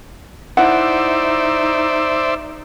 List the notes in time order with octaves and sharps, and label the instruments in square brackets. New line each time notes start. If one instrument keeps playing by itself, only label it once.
[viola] D#4 [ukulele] E4 F#5 [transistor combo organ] C5 D5 E5